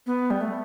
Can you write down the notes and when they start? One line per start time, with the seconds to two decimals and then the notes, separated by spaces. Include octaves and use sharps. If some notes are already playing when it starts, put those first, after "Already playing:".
0.06 B3
0.30 G3
0.41 A3